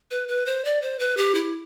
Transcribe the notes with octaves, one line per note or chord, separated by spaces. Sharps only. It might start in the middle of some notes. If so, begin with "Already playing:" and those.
B4
B4
C5
D5
C5
B4
G4
E4